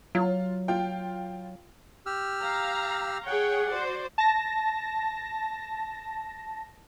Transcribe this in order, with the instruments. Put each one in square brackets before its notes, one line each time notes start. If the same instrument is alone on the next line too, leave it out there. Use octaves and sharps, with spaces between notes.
[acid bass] F#3 [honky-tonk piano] F4
[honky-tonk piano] F4 G5
[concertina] G4 E6 F6
[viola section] F5 A#5
[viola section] G#4 C#5 G5 [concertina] F#5
[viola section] F#4 C5 D5
[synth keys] A5 A#6